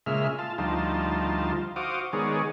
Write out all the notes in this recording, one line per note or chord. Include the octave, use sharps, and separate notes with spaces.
A#2 C#3 G#3 E5 F6
F4 A5
D2 F3 G3 D#4 F4 A5
F#4 C5 F5 D6 D#6
D#3 G#3 B3 G#4 C#5 D5